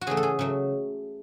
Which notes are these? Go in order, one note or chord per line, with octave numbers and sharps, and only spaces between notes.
F#4
C#3 E3 A3 G#4
A4
G#4
C#3 F#3 A3